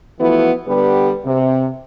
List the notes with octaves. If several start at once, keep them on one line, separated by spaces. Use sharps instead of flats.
E3 F3 A3 B3 E4 F#4
D3 G3 B3 G4 B4
C3